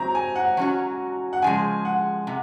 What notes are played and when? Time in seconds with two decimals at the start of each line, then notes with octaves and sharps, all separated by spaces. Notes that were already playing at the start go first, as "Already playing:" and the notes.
Already playing: C3 F#3 C4 A#5
0.15 G#5
0.36 F#5
0.57 F#3 C#4 F#4
1.33 F#5
1.42 C#3 F3 G#3 G#5
1.85 F#5
2.27 C3 F#5